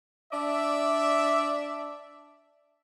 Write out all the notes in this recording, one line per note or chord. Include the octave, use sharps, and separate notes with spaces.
D4 D5 E5